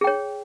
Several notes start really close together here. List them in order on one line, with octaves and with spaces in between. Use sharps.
G#4 G5 C#5